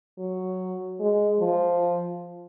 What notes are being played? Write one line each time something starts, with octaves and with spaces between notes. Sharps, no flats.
F#3
G#3
F3